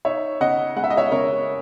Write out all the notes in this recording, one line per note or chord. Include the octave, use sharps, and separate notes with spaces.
D#4 C#5 E5
C#3 D#5 F#5
G#3 F#5
E5
D#5
C#5 E5
C#3 A#4 C#5